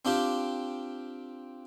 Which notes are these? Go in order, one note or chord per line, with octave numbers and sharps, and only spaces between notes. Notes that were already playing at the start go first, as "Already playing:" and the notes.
C4 D4 F4 G4